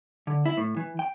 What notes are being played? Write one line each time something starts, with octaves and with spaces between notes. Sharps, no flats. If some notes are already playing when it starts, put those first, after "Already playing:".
D3
E4
A2
E3
G5